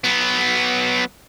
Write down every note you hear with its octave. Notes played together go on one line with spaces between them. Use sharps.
F#3 B3